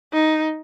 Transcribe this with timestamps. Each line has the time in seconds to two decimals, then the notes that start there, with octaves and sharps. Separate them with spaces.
0.13 D#4